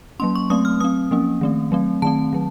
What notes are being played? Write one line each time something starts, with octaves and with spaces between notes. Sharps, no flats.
F#3 A#3 C#4 C6
C#6
F#3 A3 C4 D#6
F6
F#3 C4 D#6
F3 A#3 C#4
D#3 A3 C4
F#3 A3 C4
D#3 A3 C4 A5
D#3 F#3